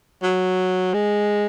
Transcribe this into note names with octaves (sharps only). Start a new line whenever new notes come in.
F#3
G#3